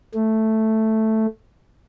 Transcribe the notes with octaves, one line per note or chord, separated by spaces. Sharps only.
A3